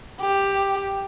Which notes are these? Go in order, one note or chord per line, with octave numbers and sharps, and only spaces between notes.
G4